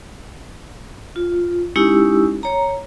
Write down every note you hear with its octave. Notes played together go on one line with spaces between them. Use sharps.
F4
G#3 C#4 D#4 E4 G4 E6
C#5 A#5